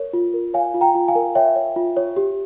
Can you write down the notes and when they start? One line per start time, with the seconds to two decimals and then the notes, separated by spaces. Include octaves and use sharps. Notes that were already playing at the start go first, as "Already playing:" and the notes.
Already playing: A#4 C#5
0.13 F4
0.34 A#4
0.54 C#5 F5 G#5
0.74 F4
0.81 G5 A#5
0.95 F4
1.08 F5 G#5
1.15 A#4
1.35 C#5 E5 G5
1.56 C#5
1.76 F4
1.97 C#5
2.17 G4